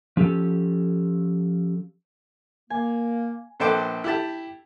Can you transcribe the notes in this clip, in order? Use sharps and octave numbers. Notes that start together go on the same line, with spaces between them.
F3 C#4 G4 A4
A#3 G#5
A#1 A4 B4 C5 G5 D6
E4 G4 A5